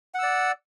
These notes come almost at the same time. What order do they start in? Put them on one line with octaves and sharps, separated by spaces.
F#5 E6 D5